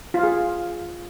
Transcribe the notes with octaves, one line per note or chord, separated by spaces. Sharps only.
F4 G#4 F5